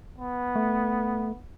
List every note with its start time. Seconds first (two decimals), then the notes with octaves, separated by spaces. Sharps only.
0.18 B3
0.56 A3